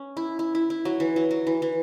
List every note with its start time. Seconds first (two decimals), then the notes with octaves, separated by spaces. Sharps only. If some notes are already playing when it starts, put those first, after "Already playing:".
Already playing: C#4
0.17 E4
0.39 E4
0.55 E4
0.70 E4
0.85 F#3
1.00 E3
1.16 F#3
1.31 F#3
1.47 E3
1.62 E3